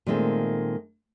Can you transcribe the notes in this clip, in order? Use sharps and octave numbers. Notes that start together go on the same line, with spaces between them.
A#2 D#3 G#3 A3 C4